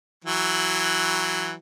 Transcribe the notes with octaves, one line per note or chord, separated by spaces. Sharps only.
E3 F#3